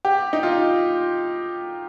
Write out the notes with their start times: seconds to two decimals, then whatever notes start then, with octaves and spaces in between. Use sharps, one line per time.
0.05 G4
0.33 D#4
0.43 F4